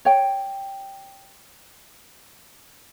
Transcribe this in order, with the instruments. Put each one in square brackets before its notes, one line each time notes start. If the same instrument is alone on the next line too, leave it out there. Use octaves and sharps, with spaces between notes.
[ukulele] C#5 G5